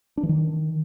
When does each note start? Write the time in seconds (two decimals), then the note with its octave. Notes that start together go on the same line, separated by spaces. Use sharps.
0.17 D4
0.23 E3
0.29 D#3